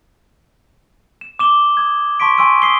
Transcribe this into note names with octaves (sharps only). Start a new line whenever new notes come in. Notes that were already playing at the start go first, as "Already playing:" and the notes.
E7
D6 E7 G7
D#6 G#6
A5 C6 C#6 B6 D7
G#5 C6 C#6 E6 D7 D#7
D#6 B6 C7 D7 G7